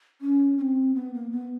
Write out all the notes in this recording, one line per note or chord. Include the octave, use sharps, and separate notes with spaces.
C#4
C#4
C4
B3
A#3
B3